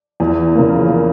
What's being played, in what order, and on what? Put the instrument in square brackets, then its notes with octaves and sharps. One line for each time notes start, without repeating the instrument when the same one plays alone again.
[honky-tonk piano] E2
C#3 F3 A#3